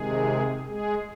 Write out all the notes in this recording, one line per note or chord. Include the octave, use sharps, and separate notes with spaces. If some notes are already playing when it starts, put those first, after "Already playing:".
Already playing: C3 D#3 G#3 G#4
G#3 G#4